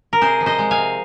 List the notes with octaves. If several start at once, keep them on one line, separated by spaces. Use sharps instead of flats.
A#4
C3 G#4 C5
F3
C5 D#5
G#3
F5 G#5
C3